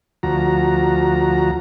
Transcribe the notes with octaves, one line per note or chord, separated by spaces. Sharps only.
D2 F3 F#4 A#5